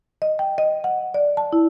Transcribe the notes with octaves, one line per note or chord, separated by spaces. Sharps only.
D#5
G5
D#5
F#5
D5
A5
E4